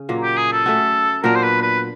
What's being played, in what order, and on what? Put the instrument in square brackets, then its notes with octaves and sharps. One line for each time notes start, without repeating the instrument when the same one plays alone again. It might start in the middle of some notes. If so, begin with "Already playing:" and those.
Already playing: [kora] C#3 C#4
A#2 F#3 A#3
[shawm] G4
G#4
A4
[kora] A3 C#4 F#4
[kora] A#2 F#3 B3 D4 [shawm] A#4
[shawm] C5
B4
B4